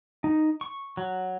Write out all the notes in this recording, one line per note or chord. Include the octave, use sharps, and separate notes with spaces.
D#4
C#6
F#3